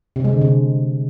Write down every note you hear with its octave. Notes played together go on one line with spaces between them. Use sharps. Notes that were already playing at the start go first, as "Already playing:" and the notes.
C3
G#3
D3
C3